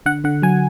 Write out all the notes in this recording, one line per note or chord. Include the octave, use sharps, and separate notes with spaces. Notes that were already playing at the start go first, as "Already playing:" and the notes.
D3 F#5
D3 F#5
F#3 G#5